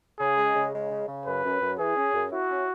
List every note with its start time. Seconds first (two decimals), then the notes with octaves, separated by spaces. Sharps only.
0.19 C#3 G#4
0.37 G#3
0.55 C#3
0.73 G#3
0.91 C#3
1.08 C#3
1.26 F#2 B4
1.44 F#2
1.61 F#2
1.78 E3 G#4
1.96 C#4
2.14 F#2
2.31 E4 F#4
2.50 C#4